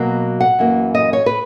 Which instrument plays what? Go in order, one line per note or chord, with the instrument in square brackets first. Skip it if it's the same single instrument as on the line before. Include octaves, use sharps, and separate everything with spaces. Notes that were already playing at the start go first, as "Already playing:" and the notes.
Already playing: [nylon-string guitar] B2 F#3 A#3
F#5
F#2 E3 A#3
D#5
C#5
B4